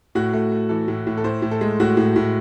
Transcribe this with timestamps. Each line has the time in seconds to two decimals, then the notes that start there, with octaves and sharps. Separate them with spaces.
0.15 A2 F#4
0.34 A3
0.52 A3
0.69 E3 A4
0.88 A2
1.07 A2
1.17 A4
1.24 A2 C5
1.42 A2
1.51 A4
1.61 G#3
1.80 A2 F#4
1.97 A2
2.16 A2